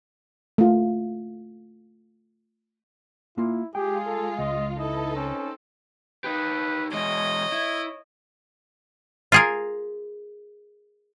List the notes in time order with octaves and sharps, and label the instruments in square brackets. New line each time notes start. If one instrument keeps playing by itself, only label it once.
[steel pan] A3 F4
[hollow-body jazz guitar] A#3 F4 [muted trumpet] E4
[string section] G#3 F4 [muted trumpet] G4 [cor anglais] G#4 [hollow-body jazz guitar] G5
[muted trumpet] A4
[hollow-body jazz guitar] C#2 [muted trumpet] D#5
[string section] D#4 A4 B4 [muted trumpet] E4 [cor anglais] D#5
[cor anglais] C4 [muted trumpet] C#4
[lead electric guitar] D#4 G4 [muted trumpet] B4
[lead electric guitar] E3 G#3 [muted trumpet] C#5 [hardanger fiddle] D#5
[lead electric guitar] E4
[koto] F4 G#4 A#4